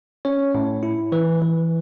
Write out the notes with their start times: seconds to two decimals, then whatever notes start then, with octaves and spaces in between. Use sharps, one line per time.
0.25 C#4 C#5
0.54 A2
0.83 E4
1.12 E3 B4
1.42 E3